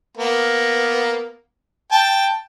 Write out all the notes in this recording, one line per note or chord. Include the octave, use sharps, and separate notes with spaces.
A#3 B3
G5 A5